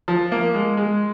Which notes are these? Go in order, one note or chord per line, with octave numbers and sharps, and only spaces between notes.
F3
A#3
G#3
G#3